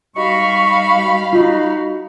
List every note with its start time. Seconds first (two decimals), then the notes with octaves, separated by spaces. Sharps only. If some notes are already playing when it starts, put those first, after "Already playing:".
0.16 G3 D#4 F#4 F5 B5 C#6
1.33 D#4 F4 F#4